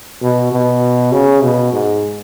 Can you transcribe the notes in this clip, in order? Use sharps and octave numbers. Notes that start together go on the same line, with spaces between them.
B2
B2
C#3
B2
G#2